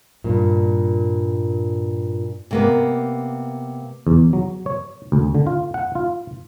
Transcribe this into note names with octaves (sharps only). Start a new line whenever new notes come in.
G2 A#2
C3 A#3 B3
E2
F#3
C#5
D2
D3
F4
F#5
F4